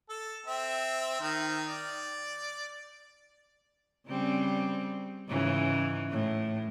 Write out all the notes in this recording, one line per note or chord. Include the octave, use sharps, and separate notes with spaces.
A4
C4 E5
D#3
D5
C#3 G3 C4
G#2 C#3 E3
A2